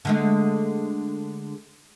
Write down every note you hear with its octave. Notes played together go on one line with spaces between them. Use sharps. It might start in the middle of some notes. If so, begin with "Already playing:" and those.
D3 G#3 A3